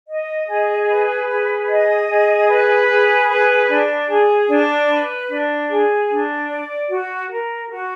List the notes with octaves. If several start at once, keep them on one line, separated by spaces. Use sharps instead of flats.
D#5
G#4
B4
G#4
D#5
G#4
B4
G#4
B4
D4
G#4
D4
B4
D4
G#4
D4
D5
F#4
A#4
F#4